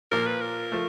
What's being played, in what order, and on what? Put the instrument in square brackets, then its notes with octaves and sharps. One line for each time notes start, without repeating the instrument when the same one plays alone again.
[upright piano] A#2 F3 A#3 [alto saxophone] A#4
[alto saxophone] B4
A#4
[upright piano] F3 A3